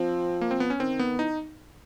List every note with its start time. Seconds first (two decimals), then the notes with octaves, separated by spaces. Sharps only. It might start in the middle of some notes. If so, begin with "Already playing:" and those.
Already playing: F3 C4
0.41 A#3
0.51 C4
0.60 B3
0.70 C#4
0.79 D#3 C4
0.99 B3
1.19 E3 D#4